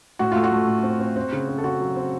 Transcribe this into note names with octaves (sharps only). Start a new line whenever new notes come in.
A2 F#4
A3 F4
F#4
A3
A2
C4
C4
C4
C#3
C4
A4
C#3 F#4
F#3
C4